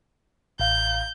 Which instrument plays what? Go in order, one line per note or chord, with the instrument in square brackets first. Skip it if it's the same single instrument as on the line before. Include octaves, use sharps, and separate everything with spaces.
[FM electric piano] A1 F5 [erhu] G6